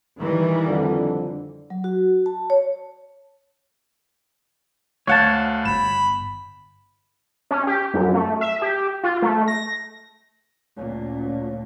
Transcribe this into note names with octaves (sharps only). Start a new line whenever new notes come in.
D#3 E3 G3
F2 D3 D4
F#3
F#4
A5
C#5
D2 C#5 F5 F#5 A5 G6
G1 B5 E7
C#4
G4
F#2
A3
E5
G4
F4
A3
A#6
D2 A#2 C#4